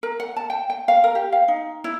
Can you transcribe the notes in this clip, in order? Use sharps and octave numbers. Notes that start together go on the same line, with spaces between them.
A#4
F#5
A5
G5
G5
F5
A#4
G4
F5
D#4
E4